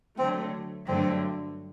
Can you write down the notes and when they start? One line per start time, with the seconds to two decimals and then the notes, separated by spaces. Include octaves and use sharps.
0.18 D3 F#3 A3 C4
0.87 G2 D3 F#3 A3 C4